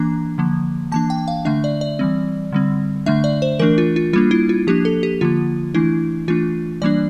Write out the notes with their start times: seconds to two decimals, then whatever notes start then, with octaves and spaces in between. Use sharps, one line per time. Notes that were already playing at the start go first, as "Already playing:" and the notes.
Already playing: E3 A#3 D4 A#5
0.38 D3 F3 A#3
0.92 E3 A#3 D4 A5
1.10 G5
1.28 F5
1.45 D3 A3 D4 E5
1.64 D5
1.81 D5
1.99 E3 G3 C4
2.52 D3 G3 C4
3.06 D3 A3 D4 E5
3.24 D5
3.42 C5
3.59 E3 A3 D4 A#4
3.78 F4
3.96 F4
4.13 G3 A#3 D4 F4
4.31 E4
4.49 F4
4.67 F3 A#3 D4 G4
4.85 A4
5.03 G4
5.21 D3 F3 A#3 F4
5.74 E3 A3 D4 E4
6.28 E3 A3 D4 F4
6.82 E3 G3 A#3 D4 D5